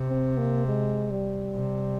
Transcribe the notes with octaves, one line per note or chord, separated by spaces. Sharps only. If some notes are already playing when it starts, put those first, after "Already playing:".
Already playing: C3
C4
A#3
G#3
G3
C3